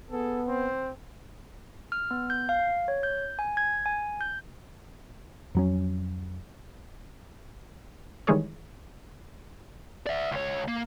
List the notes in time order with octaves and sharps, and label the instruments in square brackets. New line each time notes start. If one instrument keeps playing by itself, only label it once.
[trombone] B3 [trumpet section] G#4 A4
[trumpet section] C4 C5
[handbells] F6
B3
G6
F5
C#5
G6
G#5
G#6
G#5
G6
[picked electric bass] F2 F#3 C#4
[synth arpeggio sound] D#3 E3 G3 G#3 G#4 C#5
[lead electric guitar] D5 E5
C#2 C#5
A#3